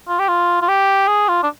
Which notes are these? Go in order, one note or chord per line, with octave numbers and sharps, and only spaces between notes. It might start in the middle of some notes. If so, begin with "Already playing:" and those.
F4
G4
F4
F4
G4
G#4
F4
D4